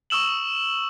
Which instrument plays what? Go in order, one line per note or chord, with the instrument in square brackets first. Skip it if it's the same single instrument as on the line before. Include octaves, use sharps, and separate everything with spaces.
[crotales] C#6 D#6 E6 E7 F#7